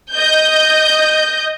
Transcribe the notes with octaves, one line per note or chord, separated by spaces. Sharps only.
D#5 G6